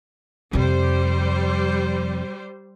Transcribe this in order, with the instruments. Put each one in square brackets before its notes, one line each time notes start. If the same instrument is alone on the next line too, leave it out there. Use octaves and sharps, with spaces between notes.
[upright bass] F2 C3 [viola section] G3 C5